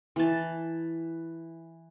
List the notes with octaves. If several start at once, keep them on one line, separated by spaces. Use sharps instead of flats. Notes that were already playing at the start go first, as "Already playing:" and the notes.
E3 A5